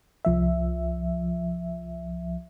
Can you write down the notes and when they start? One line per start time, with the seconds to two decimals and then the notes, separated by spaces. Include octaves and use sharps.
0.25 C2 F3 E5